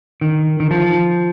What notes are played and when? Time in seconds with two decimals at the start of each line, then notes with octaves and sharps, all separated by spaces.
0.21 D#3
0.60 D#3
0.71 F3